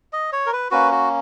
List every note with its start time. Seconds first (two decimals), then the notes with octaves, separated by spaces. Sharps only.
0.13 D#5
0.33 C#5
0.46 A#4
0.53 B4
0.71 A#3 C#4 F#4 B4
0.92 F#4